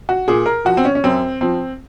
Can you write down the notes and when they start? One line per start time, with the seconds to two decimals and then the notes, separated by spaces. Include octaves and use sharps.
0.09 F#4
0.28 A#2 G#4
0.46 A#4
0.65 F3 F#4
0.77 C4
0.85 C#4
0.95 C#4
1.04 F#2 C4
1.41 F3 C4